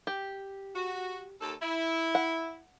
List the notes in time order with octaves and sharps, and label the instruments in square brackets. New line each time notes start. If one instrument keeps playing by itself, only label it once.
[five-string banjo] G4
[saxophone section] F#4
D#2 A4
E4
[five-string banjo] F#5